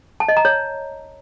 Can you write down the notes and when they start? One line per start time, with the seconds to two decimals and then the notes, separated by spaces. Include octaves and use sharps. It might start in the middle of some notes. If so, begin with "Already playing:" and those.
0.20 A5
0.29 D#5
0.37 A#5
0.45 C#5